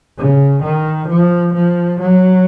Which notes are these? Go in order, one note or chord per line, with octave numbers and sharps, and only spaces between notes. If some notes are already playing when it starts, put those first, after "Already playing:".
C#3
D#3
F3
F3
F#3